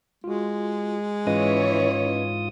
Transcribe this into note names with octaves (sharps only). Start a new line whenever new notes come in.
G#3 F4 F#4
G#2 E3 C#4 F4 B4 C#5 D#5 D#6